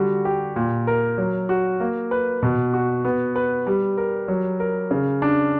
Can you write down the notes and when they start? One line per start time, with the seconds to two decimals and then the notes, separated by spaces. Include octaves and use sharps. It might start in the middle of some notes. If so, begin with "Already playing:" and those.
Already playing: D3 G3 F#4
0.25 G4
0.56 A#2
0.87 A#4
1.18 F#3
1.49 F#4
1.80 A#3
2.11 B4
2.43 B2
2.74 F#4
3.05 B3
3.36 B4
3.67 G3
3.98 A#4
4.28 F#3
4.60 A#4
4.91 C#3
5.22 D4